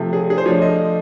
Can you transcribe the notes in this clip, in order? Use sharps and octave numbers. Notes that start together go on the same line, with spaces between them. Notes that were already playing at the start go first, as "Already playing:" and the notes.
Already playing: C3 F3 A3
G#4
G#4
C5
F3 A3 D4 C#5
D#5